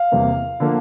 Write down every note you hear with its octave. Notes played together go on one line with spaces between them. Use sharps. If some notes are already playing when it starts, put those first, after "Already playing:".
Already playing: F5
E2 C3 G3 A#3
D3 F3 A#3